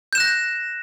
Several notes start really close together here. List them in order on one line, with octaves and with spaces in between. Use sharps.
G6 E7 F#6 A#6